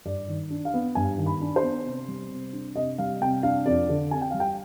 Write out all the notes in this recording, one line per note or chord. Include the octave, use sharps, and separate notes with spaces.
G2 D5
D#3
D4
F5
B3
G2 G#5
D#3
B5
D4
C5
B3
C3
G3
C3
D4
C3 D#5
G3 F5
C3 G5
D4 F5
F2 D5
D3
C4 G#5
G5
G3 F5
G5